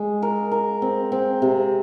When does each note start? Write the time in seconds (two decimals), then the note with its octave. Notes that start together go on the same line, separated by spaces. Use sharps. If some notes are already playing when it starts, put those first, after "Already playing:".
Already playing: G#3
0.22 A#4
0.52 A#4
0.82 C4
1.12 C4
1.42 C3